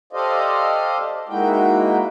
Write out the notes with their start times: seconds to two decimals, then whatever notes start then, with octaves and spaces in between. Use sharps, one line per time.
0.13 G4 A4 C5 D5 D#5 F5
1.29 G#3 A#3 D#4 E4 F#4 G5